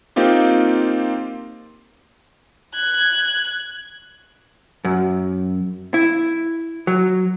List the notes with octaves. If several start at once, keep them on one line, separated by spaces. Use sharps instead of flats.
A#3 C4 D#4 F4 G4
F#6 G#6
F#2
E4
F#3